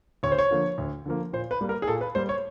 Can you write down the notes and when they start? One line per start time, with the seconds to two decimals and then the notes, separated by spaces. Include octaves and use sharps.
0.23 D2 C#5
0.32 C5
0.39 C#5
0.51 D3 F3 A#3
0.78 D2
1.06 D3 F3 A#3
1.33 A#2 C5
1.51 B4
1.61 G3 A#3
1.69 A#4
1.82 G#4
1.88 A#2 A4
2.01 B4
2.15 G3 A#3 C5
2.29 C#5